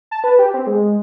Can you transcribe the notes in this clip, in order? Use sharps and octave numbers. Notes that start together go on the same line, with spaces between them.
A5
B4
G4
C4
G#3